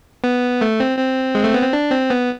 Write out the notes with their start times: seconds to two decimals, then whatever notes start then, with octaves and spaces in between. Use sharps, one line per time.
0.24 B3
0.61 A3
0.80 C4
0.98 C4
1.35 G#3
1.44 A3
1.54 B3
1.63 C4
1.73 D4
1.91 C4
2.10 B3